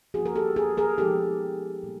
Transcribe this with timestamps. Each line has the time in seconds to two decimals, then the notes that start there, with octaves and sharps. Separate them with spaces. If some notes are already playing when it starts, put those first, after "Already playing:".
0.14 F3 A#3 C#4 F#4 G#4
0.26 A#4
0.35 G4 A4
0.56 G#4 A#4
0.77 G#4 A#4
0.98 F3 G#3 B3 D#4 G4 A4
1.83 A#2 G3 A#3